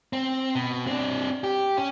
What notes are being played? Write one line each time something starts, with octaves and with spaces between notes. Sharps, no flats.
C4
B2
C4 D4
G4
C#4